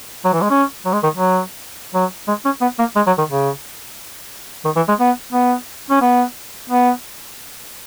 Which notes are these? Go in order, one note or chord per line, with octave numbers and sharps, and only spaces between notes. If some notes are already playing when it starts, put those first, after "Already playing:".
F#3
E3
G#3
C#4
F#3
G#3
D#3
F#3
F#3
G#3
C#4
B3
A#3
G#3
F#3
D#3
C#3
D#3
E3
G#3
B3
B3
C#4
B3
B3